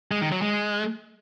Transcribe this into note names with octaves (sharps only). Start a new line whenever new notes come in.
G#3
D#3
F#3
G#3